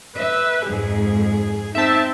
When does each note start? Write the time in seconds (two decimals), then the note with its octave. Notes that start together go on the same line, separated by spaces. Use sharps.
0.17 B4 E5
0.66 F2 G#2 G#4
1.75 C4 D#4 E5 A5